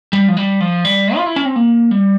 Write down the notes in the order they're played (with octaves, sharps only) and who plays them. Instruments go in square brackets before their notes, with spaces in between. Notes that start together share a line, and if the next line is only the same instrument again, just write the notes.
[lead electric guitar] G3
F3
G3
F3
G3
F4
E4
C#4
C4
A#3
G3